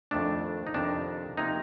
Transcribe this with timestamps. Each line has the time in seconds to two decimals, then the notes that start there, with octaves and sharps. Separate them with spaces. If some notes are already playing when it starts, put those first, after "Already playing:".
0.11 F2 D#3 A3 D4
0.67 D#4
0.74 F2 C3 D#3 D4
1.37 C3 F3 A#3 D#4